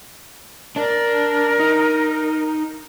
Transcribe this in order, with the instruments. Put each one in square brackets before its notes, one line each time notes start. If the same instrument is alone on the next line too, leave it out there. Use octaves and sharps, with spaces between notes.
[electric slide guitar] D4 D5 [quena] A#4
[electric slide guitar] D#4